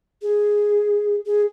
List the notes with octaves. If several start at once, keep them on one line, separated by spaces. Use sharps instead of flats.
G#4
G#4